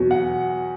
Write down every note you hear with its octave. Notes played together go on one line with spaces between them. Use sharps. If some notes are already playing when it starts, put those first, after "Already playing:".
Already playing: E2 B2 F#3
F#5